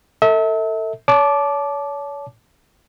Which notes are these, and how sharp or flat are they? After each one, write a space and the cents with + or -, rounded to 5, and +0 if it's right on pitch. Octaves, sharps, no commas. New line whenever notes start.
A4 +30 E5 -35
C#5 +35 A5 -20 D6 +0